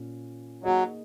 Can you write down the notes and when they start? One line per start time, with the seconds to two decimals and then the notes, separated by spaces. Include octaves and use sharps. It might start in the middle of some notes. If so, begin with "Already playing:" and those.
Already playing: A#2 C#4
0.63 F#3 A#3 D#4 G#4 D#5